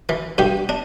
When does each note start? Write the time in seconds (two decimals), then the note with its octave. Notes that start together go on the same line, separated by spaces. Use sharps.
0.09 E3
0.38 G2 G4
0.69 D4